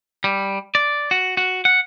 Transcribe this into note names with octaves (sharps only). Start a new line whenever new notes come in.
G3
D5
F#4
F#4
F#5